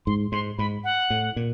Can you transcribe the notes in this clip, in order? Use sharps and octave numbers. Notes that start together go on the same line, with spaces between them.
G#2 C6
G#2 C6
G#2 B5
F#5
A2
A#2